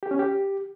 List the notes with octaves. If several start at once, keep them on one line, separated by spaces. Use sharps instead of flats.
G4
C#4
G4